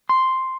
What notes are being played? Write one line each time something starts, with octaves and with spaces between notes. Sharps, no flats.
C6